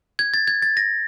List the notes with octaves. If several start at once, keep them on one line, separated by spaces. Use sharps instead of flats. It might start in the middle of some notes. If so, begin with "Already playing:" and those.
G#6
A6
G#6
A6
A#6